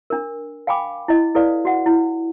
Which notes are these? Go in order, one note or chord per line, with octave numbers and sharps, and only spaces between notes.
D4 A#4
F5 G5 G#5 B5 D6
E4 D#5
E4 A4 B4 D5 F5
F#4 F#5
E4